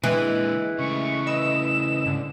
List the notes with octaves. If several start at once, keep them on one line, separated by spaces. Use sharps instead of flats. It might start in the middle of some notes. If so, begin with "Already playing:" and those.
A#2 D3 E3 G#3
C#3 A3 C#6
B4 D#5 E6 E7
G#2 D3